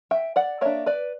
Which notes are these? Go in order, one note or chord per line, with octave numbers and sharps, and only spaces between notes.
E5 G5
D5 F#5
A#3 D4 C#5 E5
B4 D5